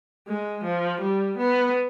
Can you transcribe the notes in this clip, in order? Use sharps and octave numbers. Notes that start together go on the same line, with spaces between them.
G#3
F3
G3
B3